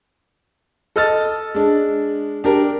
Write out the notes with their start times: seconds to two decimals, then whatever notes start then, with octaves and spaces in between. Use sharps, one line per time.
0.96 A4 D#5 E6 F6 A6
1.55 G#3 D4
2.44 D4 G4 A#4